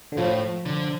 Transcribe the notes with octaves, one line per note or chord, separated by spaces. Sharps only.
D3
A2 F3
D3